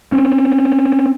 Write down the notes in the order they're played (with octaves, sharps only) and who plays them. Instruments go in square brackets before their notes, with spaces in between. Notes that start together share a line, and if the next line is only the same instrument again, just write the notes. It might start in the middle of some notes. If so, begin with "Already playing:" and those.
[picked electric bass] C4 C#4